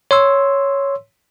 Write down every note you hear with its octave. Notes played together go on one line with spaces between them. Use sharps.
C#5 C6 E6